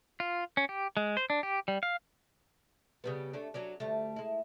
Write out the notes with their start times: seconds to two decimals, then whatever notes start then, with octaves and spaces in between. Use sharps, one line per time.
0.20 F4
0.57 C#4
0.69 G4
0.97 G#3
1.17 C5
1.30 D4
1.43 G4
1.68 G3
1.83 F5
3.04 C#3 G3 B3
3.33 A3 C#4 D4
3.54 F#3 C#4 D4
3.80 D2 G3 A3
4.16 G#3 E4